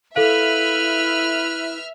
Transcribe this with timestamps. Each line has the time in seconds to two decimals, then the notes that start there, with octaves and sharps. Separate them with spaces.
0.16 E4 A4 B4 E5 F5 F6